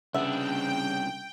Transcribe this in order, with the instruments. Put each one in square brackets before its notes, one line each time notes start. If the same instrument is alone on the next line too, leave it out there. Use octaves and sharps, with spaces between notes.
[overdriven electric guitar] C2 D4 [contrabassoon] C#3 [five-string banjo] B3 E5 [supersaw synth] G5